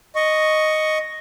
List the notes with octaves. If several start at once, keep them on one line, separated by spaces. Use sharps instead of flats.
D#5 C#6